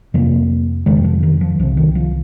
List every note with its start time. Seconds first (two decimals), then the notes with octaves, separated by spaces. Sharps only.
0.14 F2 C3 F3 A#3
0.86 F2 C3 D#3 G#3
1.04 F3
1.23 D#3
1.41 F3
1.59 C2 C3 F3
1.77 D#3
1.95 F3